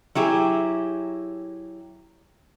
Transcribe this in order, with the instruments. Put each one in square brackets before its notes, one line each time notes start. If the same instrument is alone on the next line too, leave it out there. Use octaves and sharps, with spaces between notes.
[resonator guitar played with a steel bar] F#3 E4 G4 G#4